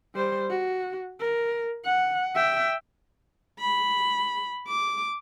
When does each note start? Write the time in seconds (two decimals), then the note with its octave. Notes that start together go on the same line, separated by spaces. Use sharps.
0.15 G3 C5
0.50 F#4
1.20 A#4
1.85 F#5
2.35 E5 G5
3.60 B5
4.68 D6